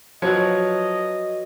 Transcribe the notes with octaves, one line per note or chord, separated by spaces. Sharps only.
F3 F#3 F#4 B4 C#5 D#5